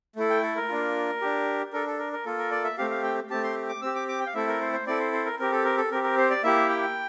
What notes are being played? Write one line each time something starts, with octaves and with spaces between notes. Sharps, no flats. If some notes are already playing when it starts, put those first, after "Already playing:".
A3 E4 A4
G5
A4
A#4
A#3 D4 F4
D4 G4
D4 A4 A#4
A4
A#4
A#4
A#3 F4 A4
A#4
D5
E5
A3 C4 G4 F5
F5
G5
A3 C4 G4 A5
C6
D6
C4 G4 E6
D6
D6
G5
F5
A3 C4 E4 A4 E5
A#4
C5
C5
C4 E4 A4 D5
C5
C5
A#4
C4 G4 A#4
A4
A#4
A4
C4 G4 A#4
A#4
C5
D5
A#3 E4 G4 E5
G5